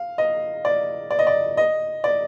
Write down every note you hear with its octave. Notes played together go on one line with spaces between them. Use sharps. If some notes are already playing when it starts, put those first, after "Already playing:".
Already playing: F5
D#5
D5
D5
D#5
D5
D#5
D5